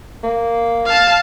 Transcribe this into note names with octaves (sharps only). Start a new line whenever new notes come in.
A#3
F5 A5